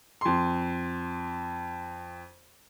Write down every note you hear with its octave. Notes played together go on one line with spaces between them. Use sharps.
F2 C6